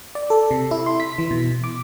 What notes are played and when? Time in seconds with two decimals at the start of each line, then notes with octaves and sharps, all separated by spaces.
0.15 D5
0.30 A4
0.51 C3
0.71 E4
0.86 C6
1.00 B6
1.18 E3
1.31 B2
1.64 D6